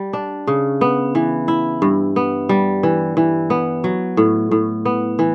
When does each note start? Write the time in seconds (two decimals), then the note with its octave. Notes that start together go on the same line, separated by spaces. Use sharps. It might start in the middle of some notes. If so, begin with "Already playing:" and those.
Already playing: G3
0.13 D4
0.47 C#3
0.81 B3
1.15 E3
1.48 E4
1.82 G2
2.16 B3
2.49 G3
2.83 E3
3.17 E3
3.50 B3
3.84 F#3
4.17 A2
4.51 A2
4.85 B3
5.19 E3